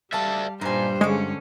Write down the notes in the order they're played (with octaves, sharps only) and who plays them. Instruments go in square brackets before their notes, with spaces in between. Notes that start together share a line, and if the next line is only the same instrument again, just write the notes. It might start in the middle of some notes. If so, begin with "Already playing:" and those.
[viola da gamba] G3 [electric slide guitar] A4 D5 E5 [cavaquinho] F5 A5
[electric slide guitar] G2 [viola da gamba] A#2 G3 C5 [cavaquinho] D#4 G#5
[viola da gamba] D3 C#4 [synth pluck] G#3 [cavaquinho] C#5 D6